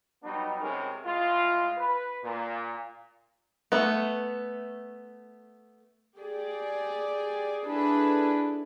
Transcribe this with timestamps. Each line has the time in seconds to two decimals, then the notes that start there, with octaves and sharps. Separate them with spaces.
0.23 F#3 G3 B3 D#4
0.61 E2 C3 G#3 C#4 A#4
1.05 A2 G#3 F4
1.78 B4
2.24 A#2
3.72 A3 B3
6.18 G4 G#4 D5
7.66 D4 E4 G#4 A4 B4